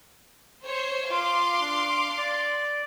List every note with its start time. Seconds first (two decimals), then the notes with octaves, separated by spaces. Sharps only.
0.65 C5 C#5
1.10 F4 F5 C6 D6
1.61 D4
2.18 D5